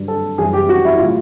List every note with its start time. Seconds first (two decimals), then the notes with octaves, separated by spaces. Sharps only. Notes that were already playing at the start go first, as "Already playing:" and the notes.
Already playing: G2 D3 F#3
0.08 A4
0.38 F#2 C#3 E3 G3 G#4
0.53 G4
0.69 F#4
0.85 E4
0.95 E4
0.99 A2 F#3 F4